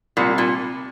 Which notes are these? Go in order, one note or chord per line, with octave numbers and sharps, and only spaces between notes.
C2 A#2
A#2